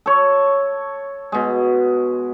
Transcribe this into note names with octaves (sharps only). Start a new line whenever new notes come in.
A4 C#5
B2 G#3